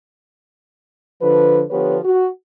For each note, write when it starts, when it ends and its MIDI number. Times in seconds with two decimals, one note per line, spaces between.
1.21 1.62 50
1.21 1.62 53
1.21 1.62 71
1.71 1.97 50
1.71 1.97 53
1.71 1.97 59
1.71 1.97 67
1.71 1.97 71
1.71 1.97 73
2.03 2.27 66